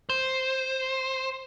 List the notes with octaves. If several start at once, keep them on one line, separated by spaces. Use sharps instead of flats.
C5